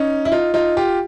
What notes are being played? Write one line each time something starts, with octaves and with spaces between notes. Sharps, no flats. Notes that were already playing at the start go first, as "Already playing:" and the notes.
Already playing: C#4 D#4
E4
D#4 F4
D#4 F4
F4 G4